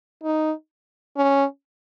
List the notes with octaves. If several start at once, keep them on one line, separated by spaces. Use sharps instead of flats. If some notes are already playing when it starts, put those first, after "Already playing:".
D#4
C#4